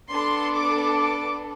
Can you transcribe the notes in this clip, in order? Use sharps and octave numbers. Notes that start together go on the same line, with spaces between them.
B3 D4 A4 C6
D6
D6